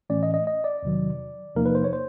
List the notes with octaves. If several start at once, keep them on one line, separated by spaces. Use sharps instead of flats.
A2 E3 A3 C#4 D5
D#5
D#5
D#5
D5
E2 C3 D#3 F#3
E2 C3 F3 A#3 D#4 A#4
B4
C5
C#5
C5